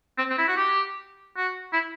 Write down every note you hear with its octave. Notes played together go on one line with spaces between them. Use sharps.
C4
C4
E4
F#4
G4
F#4
E4